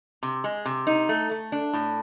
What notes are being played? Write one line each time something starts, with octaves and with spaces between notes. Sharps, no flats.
C3
G#3
C3
D#4
A3
A3
D4
A2